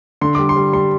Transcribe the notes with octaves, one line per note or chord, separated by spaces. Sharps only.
D3 C6
G3 D6
C6
G3
G3 C6